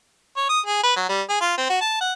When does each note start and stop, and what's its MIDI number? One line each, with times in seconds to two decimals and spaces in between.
0.37 0.45 73
0.49 0.61 87
0.66 0.80 68
0.83 0.94 71
0.96 1.09 54
1.09 1.21 55
1.29 1.37 68
1.41 1.56 65
1.57 1.68 60
1.70 1.77 66
1.81 1.96 81
2.01 2.13 78